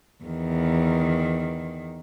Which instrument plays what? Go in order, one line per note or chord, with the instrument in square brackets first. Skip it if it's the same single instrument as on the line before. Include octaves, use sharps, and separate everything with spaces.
[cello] E2 D#3